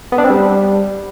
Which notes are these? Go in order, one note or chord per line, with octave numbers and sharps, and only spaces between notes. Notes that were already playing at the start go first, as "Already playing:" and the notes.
B3
D4
C4
G3